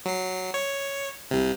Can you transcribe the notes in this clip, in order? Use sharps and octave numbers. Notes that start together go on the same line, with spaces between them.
F#3 C7
C#5
C2 C3